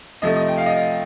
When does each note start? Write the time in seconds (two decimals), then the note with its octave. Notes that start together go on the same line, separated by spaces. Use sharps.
0.22 C3 F3 A3 D#5
0.36 D#5
0.48 G5
0.57 F5
0.66 D#5
0.76 F5